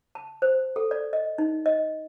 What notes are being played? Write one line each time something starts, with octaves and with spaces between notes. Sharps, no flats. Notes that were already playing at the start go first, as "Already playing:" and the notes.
A5
C5
A4
D5
D#5
D#4
D#5